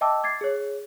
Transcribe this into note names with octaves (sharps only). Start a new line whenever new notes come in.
D#5 E5 G5 A5 D6 E6
D6 G#6 A6 C7
G#4 C#5